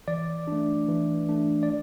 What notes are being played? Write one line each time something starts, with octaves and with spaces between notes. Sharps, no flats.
E3 D5
A3 D4
E3
A3 D4
D5